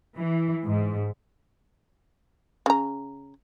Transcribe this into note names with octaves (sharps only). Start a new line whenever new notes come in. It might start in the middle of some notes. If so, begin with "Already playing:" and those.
E3
G#2
C#3 A#5